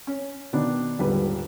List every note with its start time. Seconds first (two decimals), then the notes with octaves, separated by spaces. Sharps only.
0.07 C#4
0.53 B2 D#3 B3 D4
0.99 D#1 G#2 D3 G3 B4